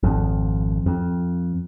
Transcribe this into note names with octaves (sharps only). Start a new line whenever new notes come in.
G#1 F2
F2